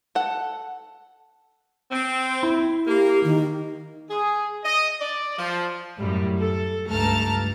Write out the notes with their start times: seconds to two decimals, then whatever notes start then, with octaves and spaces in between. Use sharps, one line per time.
0.15 A4 F#5
1.91 C4
2.43 E4
2.86 A#3 G4
3.24 D#3
4.11 G#4
4.64 D#5
5.01 D5
5.38 F3
5.98 F#2 A2 G3
6.39 A4
6.88 C#2 G2 A3 A5 A#5 F6